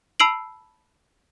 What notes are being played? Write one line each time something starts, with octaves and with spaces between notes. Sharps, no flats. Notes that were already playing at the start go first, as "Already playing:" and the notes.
A5 B5 E6 C7 D7 F#7